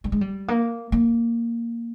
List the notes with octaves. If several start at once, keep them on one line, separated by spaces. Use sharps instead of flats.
G3
G#3
G3
A#3
A#3